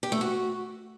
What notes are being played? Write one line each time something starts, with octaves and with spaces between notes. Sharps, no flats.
G4
A3
F#4